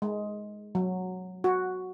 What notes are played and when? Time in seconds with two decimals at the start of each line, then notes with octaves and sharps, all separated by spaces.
0.02 G#3
0.75 F#3
1.44 F#4